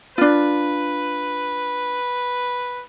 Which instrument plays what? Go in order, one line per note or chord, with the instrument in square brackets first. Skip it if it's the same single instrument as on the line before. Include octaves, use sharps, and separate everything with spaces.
[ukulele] D4 F4 [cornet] B4